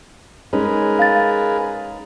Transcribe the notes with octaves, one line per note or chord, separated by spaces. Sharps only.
G#3 C#4 D#4 G#4 A#4 B4
F5 A6